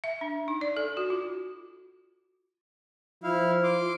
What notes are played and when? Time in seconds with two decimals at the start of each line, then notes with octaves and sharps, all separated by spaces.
0.04 E5
0.21 D4
0.48 D#4
0.61 D5
0.77 A4
0.97 F#4
1.10 F4
3.23 F3 E4 F5
3.64 C6 D6